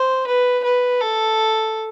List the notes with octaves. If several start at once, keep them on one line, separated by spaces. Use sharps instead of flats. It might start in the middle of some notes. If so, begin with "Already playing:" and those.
Already playing: C5
B4
B4
A4